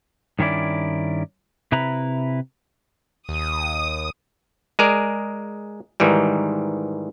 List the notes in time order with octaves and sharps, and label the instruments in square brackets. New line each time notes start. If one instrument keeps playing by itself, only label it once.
[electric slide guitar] G2 D#3 C#4 E4 D5
C3 E4 B4 A#5
[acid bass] D#2 [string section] D#6
[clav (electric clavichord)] G#3 G#4 A#4 D5
G#2 D#3 E3 G3